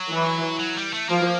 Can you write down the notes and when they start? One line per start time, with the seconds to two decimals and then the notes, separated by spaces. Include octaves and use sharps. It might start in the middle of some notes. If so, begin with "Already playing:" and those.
Already playing: F#3
0.11 E3
0.59 F#3
0.76 G3
0.93 A3
1.09 F3 A#3